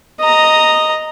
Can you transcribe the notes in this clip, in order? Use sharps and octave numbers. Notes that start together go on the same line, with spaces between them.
D#5 A#5